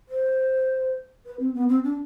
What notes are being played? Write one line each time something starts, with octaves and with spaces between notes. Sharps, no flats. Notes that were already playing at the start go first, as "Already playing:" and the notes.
C5
B4
C4
B3
C4
D4